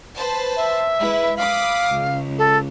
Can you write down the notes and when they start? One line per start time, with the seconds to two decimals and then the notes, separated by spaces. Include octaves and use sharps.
0.15 B4 C5 A5
0.56 E5
0.98 G#3 E4 B4
1.37 F5 B5 D6 D#6
1.90 C#2
2.38 A4